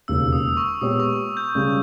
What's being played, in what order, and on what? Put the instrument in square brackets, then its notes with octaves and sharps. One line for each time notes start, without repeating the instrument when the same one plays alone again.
[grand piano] E1 D#2 C#3 [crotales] E6
[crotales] D#6
C#6
[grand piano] A#2 G#3 B3 G4 C#5 [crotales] D#6
[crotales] C#6
G6
[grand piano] C#2 C#3 G3 C#4 G#4